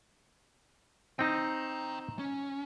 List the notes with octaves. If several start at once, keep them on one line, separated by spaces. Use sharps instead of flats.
C4 D#4 G5 A#5
C#4